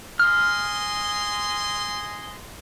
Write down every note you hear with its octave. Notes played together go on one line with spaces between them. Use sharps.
D#5 G#5 C6 F6